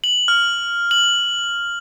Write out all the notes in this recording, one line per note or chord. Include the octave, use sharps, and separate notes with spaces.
F#7
F6
F#7